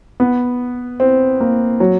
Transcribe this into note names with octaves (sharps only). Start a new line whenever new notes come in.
B3
C4
A#3
F#3